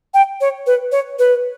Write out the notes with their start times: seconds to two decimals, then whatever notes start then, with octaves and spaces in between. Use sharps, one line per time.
0.14 G5
0.41 C#5
0.66 B4
0.92 C#5
1.19 B4